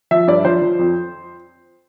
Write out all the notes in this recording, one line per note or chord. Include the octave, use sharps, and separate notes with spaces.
F3 E5
G2 D5
F3 C5
F3
F2